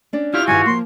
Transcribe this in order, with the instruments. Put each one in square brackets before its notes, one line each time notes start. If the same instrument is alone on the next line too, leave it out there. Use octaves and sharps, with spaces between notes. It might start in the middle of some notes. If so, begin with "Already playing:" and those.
[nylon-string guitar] C#4 D4 D5
[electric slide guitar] E4 F4 G4 [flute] F6
[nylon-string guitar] G2 D#3 G3 [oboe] F#4 [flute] G#5
[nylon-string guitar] F3 A#3 [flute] C6